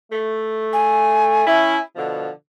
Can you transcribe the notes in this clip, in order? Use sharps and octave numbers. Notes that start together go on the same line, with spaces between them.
A3
G#5
C#4 E4
B2 D3 F3